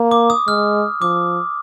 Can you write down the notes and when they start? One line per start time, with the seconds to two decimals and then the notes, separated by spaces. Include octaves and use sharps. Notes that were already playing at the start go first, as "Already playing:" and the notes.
Already playing: A#3
0.11 D6
0.30 D#6
0.47 G#3 F6
1.02 F3 D6